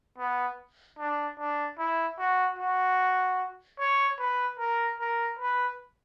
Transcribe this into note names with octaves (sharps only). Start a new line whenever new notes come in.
B3
D4
D4
E4
F#4
F#4
C#5
B4
A#4
A#4
B4